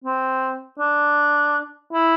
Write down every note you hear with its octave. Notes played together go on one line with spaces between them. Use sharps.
C4
D4
E4